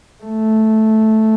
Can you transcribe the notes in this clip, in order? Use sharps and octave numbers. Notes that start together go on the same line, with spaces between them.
A3